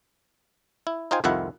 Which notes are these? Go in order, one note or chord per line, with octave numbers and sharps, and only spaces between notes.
E4
D#4 F4 C5 G5 G#5
C2 F2 D#3 E4 F4 F#5